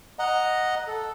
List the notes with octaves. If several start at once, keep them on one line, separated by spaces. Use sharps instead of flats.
D#5 F#5 A#5
A4